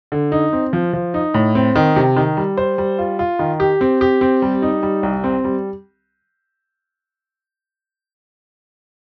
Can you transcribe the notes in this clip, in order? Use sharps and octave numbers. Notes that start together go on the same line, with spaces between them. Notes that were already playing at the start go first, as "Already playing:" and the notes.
D3
D#4
C4
F3
F3
D#4
A2
C4
D#3
C3
D#3
G3
C5
G3
F4
F4
D#3
G4
C4
G4
C4
G3
D#4
G3
C2
C4
G3